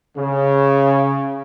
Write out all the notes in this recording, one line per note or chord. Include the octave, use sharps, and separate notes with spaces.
C#3